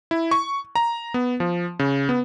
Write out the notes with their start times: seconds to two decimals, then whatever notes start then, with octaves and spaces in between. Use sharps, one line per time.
0.11 E4
0.31 C#6
0.76 A#5
1.14 B3
1.40 F3
1.79 C#3
2.09 B3